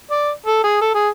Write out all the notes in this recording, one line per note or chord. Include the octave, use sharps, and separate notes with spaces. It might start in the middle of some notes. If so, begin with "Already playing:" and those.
D5
A4
G#4
A4
G#4